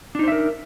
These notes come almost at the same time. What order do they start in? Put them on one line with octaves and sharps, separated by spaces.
D4 D#4 C5 E5 A#4